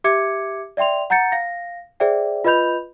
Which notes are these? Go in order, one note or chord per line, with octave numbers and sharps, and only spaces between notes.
G4 E5 D6 G#6 C#7
D5 E5 G5 C6 F7
F#5 A#5 G6 A6 C#7
F5 A#6
G#4 C5 D5 E5 G5
F4 B4 D#5 B5 G6 F7